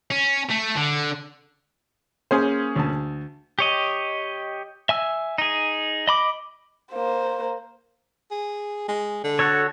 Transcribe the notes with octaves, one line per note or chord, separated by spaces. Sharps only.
C#4
A3
D3
A#3 C#4 G#4 C5 G#5
D2 A5
G4 C#5 D#5
E5 G#5 E6
D#4 G#4
D#5 B5 D6
A#3 C5
G#4
G#3
D3
F#4 A4 C#5